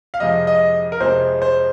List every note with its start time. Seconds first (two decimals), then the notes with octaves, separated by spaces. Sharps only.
0.14 F5
0.20 F2 C3 F3 G#3 D#5
0.47 D#5
0.92 A#4
1.00 F2 C3 F3 G#3 C5
1.42 C5